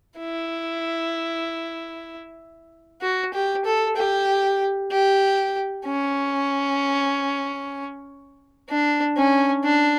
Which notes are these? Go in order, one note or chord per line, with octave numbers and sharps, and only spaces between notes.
E4
F#4
G4
A4
G4
G4
C#4
D4
C#4
D4